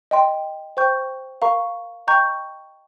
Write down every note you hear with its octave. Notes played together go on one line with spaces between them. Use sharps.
D#5 G5 C6
C5 G5 C#6 G6
A#4 F5 A#5 C#6
D#5 G5 A#5 C#6 G6